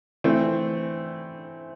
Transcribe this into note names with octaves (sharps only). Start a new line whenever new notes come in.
E3 A3 C4